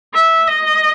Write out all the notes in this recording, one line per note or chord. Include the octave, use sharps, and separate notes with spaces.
E5
D#5